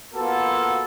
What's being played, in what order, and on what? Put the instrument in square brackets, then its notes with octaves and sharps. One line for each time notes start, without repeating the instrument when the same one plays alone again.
[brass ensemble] A#3 B3 F4 F#4 A4